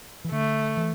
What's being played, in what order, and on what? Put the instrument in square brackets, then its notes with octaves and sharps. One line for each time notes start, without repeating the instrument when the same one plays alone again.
[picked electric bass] E3
[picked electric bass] D3 [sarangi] A3
[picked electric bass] E3